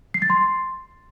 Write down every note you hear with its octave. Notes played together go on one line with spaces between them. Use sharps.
C7
A6
C6